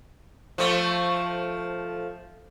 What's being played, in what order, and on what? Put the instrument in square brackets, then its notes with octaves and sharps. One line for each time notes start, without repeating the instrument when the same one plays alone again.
[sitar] F3 A3